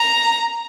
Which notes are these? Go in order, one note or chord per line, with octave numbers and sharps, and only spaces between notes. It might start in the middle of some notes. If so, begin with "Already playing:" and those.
Already playing: A#5